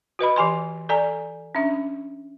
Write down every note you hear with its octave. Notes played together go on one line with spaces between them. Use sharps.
F#4 B4 D#5 B5
E3 G4 G#5 C6
A4 D5 G#5 A#5
C#4 D4 E5